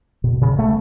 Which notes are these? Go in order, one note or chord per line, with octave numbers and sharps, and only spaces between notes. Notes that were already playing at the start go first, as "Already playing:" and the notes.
B2
C#3
A3